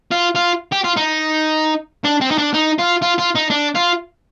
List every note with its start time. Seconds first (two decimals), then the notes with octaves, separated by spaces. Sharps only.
0.11 F4
0.35 F4
0.72 G4
0.84 F4
0.97 D#4
2.05 D4
2.21 C4
2.31 D#4
2.38 D4
2.54 D#4
2.78 F4
3.02 F4
3.18 F4
3.35 D#4
3.50 D4
3.75 F4